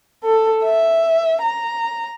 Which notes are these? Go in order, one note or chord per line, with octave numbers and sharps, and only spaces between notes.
A4
E5
A#5